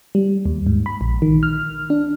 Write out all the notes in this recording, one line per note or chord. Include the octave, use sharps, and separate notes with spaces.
G3
D#2
G#2
B5
A#1
D#3
F6
D4